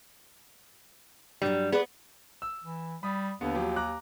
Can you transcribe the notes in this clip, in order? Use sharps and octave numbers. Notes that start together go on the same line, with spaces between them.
G2 F#3 G3
B3 G#4 B4 D5
E6
E3
G3 B5 D#6
D#2 D3 B3
F3 F#3 G4
A#5 D6 F#6